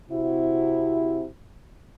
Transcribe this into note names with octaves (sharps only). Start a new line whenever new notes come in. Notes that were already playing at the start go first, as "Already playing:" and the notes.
C3 E4 F#4